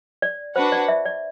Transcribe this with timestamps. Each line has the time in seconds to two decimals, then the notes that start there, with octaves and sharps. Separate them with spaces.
0.22 D5
0.55 D4 F#4 B4 C5 F#5
0.72 D5
0.88 E5
1.05 D5